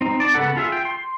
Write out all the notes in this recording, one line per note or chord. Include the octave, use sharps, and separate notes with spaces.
C4 D#4
D5 A5
C#3 B3 A4 F#5
F4 G#4 E5
G5
C6